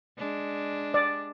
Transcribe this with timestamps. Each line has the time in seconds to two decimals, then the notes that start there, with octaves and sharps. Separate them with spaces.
0.18 G#3 D4
0.94 D5